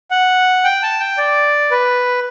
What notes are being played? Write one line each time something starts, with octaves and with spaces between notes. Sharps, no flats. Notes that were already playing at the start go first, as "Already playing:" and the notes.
F#5
G5
A5
G5
D5
B4